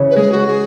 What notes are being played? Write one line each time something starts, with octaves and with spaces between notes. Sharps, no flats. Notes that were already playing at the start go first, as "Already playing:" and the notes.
Already playing: C#3 E3 C#4 E4
B4
G#3 G#4
F#4
G#4